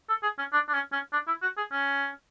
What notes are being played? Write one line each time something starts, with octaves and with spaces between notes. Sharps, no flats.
A4
G#4
C#4
D4
D4
C#4
C#4
D4
E4
F#4
G#4
C#4